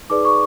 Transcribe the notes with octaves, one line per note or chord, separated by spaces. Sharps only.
D#4 G#4 B4 D5 D6
C#6